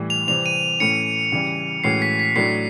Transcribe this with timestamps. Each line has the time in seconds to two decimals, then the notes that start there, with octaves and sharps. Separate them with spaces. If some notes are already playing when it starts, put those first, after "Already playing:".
Already playing: A2 E3 G3
0.10 F7
0.27 C3 E3 G3 C4 F7
0.46 D#7
0.80 A2 E3 A3 C#4 C#7
1.32 C#3 E3 G3
1.84 A2 E3 G#3 C#4 F#4 C7
2.02 B6
2.19 B6
2.36 A2 F#3 A3 D4 C7